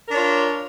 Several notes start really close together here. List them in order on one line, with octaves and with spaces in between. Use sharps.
A#4 D4 C#5 F4